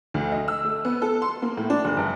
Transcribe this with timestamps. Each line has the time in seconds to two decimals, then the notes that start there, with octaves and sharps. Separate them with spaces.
0.14 D2
0.32 D#5
0.48 E6
0.65 A3
0.85 B3
1.02 A4
1.22 C6
1.42 A#3
1.57 A2
1.70 D4
1.85 F#1
1.97 G1